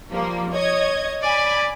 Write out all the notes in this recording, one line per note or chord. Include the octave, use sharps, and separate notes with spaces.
F3 G3 A#3
C#5 D#5 G#6
D5 G#5 B5